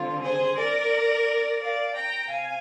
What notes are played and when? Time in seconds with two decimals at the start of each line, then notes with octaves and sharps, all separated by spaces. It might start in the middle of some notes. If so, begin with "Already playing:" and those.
Already playing: D3 G3 C4 F4
0.23 G#4 C5
0.57 A#4 D5
1.61 D5 F5
1.95 G5 A#5
2.29 C3 F5 G#5